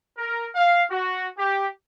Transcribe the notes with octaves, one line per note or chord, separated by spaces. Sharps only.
A#4
F5
F#4
G4